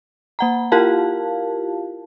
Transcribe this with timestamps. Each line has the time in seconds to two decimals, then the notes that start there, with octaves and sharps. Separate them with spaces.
0.39 A#3 F#5 A#5
0.72 E4 F4 G4 A#4 F5 A5